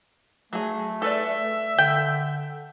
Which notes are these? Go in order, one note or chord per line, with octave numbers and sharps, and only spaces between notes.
F#3 A3 G#4
A4 B4 D5 E5
D3 G5 G6